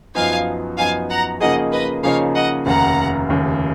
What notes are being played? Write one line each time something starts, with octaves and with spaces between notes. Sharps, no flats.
F#2 F3 B3 D#4 F5 G#5
F#2 F3 B3 D#4 F5 G#5
F#5 A#5
C#3 F3 A#3 D#4 G#4 D#5 F#5
B4 D#5
C#3 F3 A#3 D#4 G#4 C#5 F5
D#5 F#5
F1 D#2 C#3 F#5 A#5
F1 D#2 C#3